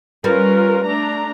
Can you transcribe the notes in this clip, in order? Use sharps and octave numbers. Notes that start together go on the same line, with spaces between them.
G3 C#4 F4 A#4 B4
A3 D4 A#5